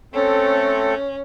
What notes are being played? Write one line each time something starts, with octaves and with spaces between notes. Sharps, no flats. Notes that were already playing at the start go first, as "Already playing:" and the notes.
A3 C4 C#4 A4